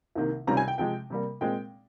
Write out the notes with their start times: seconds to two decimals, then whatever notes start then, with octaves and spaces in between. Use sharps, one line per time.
0.15 C2 C3 D#3 A#3
0.47 C#2 C3 D#3 G3 C#4 A#5
0.57 G#5
0.68 G5
0.78 C3 F3 G#3 G5
1.10 C3 G3 A#3
1.41 A#2 G#3 C4 G5